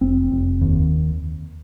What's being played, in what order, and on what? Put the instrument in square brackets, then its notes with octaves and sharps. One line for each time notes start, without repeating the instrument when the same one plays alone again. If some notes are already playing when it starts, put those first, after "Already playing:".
[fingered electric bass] F1 C4
F1
D#2